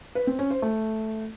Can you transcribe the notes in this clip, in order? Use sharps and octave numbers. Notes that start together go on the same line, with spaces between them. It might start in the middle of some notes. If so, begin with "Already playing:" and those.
B4
C4
C#4
C5
A3